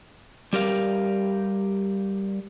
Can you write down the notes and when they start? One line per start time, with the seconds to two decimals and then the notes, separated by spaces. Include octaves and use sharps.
0.53 G3 G4 A#4 F5